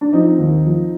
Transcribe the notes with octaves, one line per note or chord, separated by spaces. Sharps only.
D4
F3 C4 D#4
D#2
F3